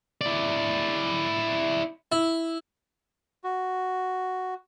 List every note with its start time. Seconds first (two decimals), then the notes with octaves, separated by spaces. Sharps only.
0.21 E4 D5
2.12 E4
3.44 F#4